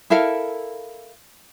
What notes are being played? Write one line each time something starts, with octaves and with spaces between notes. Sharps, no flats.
E4 A4 A#4 F5